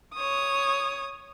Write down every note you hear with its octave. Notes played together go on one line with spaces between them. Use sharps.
C#5 D#6